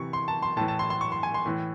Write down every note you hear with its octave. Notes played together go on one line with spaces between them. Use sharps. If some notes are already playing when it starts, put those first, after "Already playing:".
Already playing: C3 E3 C#6
C6
A5
C6
A2 E3 A5
A5
C6
C6
C#6
C6
G#5
C6
A2 E3